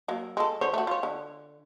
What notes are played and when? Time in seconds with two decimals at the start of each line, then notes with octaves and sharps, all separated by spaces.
0.08 F#3 A#3
0.37 G#3 A4
0.61 D3 C5 C#5
0.74 A3 F#4
0.87 F4 C#5
1.03 D3